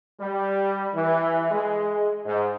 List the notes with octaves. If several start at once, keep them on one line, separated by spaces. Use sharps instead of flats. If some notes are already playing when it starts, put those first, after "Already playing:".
G3
E3
G#3
G#2